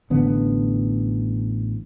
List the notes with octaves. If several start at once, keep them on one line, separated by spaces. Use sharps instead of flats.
A1 D3 B3